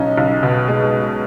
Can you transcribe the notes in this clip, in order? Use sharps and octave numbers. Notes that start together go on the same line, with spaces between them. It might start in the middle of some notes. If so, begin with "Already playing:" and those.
Already playing: B1 C#4 D#4
B1
B2
G#3